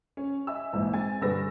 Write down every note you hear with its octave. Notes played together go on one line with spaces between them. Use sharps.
C#4
D#5 E5 G#5 E6
A#1 G#2 E3
G#3 C4 G#5 A6
G2 D3 G#4 B4 E6 A#6